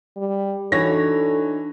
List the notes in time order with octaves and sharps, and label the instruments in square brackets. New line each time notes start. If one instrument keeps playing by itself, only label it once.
[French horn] G3
[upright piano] E3 C#5 A#6 [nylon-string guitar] D4 D#4 F#4 [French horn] A4